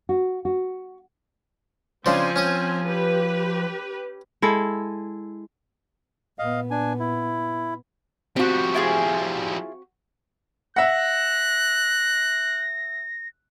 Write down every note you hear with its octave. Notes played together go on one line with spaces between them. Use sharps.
F#4
F#4
C#3 F3 C4 D4 C5 G#5
C#4 C#6 D#6
G4 B4
G#3 E4 A4
A#2 B3 D#5 F5
D4 G#5
E4
F3 G3 C4 F#4
E4 F4 G#4
E5 F#5 F#6 A#6